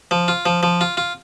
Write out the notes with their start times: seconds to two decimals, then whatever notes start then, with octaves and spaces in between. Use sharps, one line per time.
0.11 F3
0.28 F4
0.46 F3
0.63 F3
0.81 F4
0.97 F4